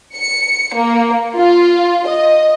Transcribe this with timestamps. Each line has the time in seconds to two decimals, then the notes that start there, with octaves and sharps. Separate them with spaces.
0.15 C#7
0.76 A#3
1.36 F4
2.08 D#5